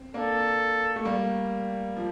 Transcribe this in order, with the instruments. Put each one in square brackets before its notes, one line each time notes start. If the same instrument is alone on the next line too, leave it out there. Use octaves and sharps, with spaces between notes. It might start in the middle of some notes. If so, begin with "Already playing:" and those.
Already playing: [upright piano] C4
[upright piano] A#3 D4 [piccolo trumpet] A4
[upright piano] A3
G3 A#3
F3